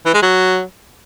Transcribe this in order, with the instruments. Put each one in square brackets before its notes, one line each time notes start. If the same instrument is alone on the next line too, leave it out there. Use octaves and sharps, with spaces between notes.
[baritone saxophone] E3
G#3
F#3